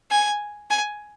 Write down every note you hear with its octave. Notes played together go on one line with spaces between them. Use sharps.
G#5
G#5